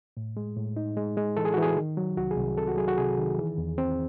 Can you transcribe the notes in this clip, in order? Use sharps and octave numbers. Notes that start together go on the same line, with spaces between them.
A2
G#3
A2
D#4
G#3
G#3
E3 A4
G#4
F#4
E3 G#4
D#3
F#3
C2 F#4
G#4
C2
C3 A4
F#4
F#3 G#4
F#4
C3 G#4
D#3
E3
E2
C4